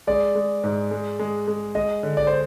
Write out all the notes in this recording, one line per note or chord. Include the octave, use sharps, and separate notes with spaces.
G#3 D5
G#3
G#2
G#3
G#3
G#3
G#3 D#5
D3
D5
C5